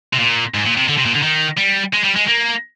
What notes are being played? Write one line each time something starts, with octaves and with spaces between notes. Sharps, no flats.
C3
A#2
G#2
A#2
C3
D3
C3
A#2
D3
D#3
G3
G#3
G3
G#3
A#3